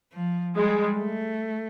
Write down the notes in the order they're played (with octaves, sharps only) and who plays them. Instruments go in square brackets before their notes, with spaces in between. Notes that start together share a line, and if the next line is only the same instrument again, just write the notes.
[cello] F3
[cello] G3 [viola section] G#3
[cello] A3